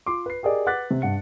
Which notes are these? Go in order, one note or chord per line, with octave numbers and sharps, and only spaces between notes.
F4 C6 D6
B4 C7
G4 G#4 A#4 D5 D#5
B4 F#5 D6 F#6 A6 B6
C3
G2 F#5 C#7